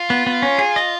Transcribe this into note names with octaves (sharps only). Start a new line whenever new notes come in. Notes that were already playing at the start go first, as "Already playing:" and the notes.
Already playing: F4
B3
B3
C#4
G#4
D#5